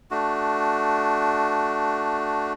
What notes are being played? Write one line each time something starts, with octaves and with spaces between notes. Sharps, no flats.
A3 D4 F#4